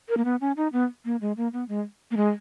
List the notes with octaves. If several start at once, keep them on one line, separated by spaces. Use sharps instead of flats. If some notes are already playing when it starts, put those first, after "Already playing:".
A#4
A#3
B3
C#4
D#4
B3
A#3
G#3
A#3
B3
G#3
A#3
G#3